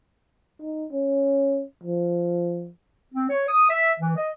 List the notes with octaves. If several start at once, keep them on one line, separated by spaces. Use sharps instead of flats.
D#4
C#4
F3
C4
C#5
D#6
E5
E3
D#5